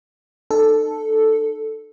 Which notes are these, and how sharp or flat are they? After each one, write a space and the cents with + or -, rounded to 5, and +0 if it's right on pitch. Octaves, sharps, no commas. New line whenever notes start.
D#4 -40 A4 +0